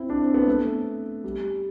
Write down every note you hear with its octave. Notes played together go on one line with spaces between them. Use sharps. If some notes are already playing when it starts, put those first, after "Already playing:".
Already playing: C4 E4
D4
C4
B3
A3
G3